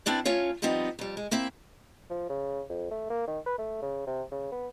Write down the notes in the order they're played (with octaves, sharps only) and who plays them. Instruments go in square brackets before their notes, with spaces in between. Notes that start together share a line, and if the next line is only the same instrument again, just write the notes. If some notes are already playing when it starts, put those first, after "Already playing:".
[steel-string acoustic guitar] B3 C4 D4 E4 D5
A3 C#4 F4 C#5
F3 G3 B3 C4 D#4
F2 G3
G#3
A#3 C4 E4 E5
[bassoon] F3
C#3
F2
A3
A#3
D#3
B4
A3
C#3
C3
C#3
B3